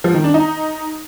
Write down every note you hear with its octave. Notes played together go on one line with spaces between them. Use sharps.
F3
D#3
D4
D#4